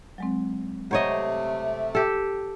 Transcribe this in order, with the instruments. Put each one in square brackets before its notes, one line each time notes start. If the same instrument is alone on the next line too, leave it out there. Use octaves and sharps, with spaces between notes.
[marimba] F#3 G#3 C4
[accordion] C3 A3 [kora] C5 C#5 D#5 [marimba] F#5 A#5 C#6
[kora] G4 A4